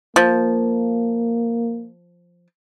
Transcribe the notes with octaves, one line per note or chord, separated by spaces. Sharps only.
F3 A#3